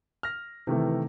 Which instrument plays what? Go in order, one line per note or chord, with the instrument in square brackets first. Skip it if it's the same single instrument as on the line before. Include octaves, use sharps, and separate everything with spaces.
[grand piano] F6 A#6
[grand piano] C3 D#3 A3 [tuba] E3